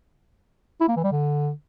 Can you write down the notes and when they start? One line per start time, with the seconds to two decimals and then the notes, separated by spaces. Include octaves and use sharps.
0.81 E4
0.89 A#3
0.96 E3
1.04 G3
1.12 D3